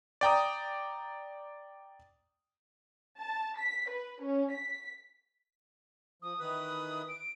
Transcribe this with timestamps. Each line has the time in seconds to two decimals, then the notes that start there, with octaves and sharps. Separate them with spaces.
0.21 D5 G5 A#5 D#6
3.18 A5
3.57 B6
3.89 B4
4.22 C#4
4.51 B6
6.22 F3 D#6
6.40 D#3 E3 B4
7.09 D7